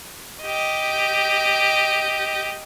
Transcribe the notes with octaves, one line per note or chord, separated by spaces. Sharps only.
G4 D#5